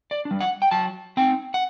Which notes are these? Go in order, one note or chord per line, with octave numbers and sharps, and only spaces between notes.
D5
D4
G3
F#5
G5
F#3 A5
C4 D#4 G5
F#5